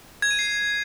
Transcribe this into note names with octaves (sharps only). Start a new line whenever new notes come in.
G#6
D#7
C7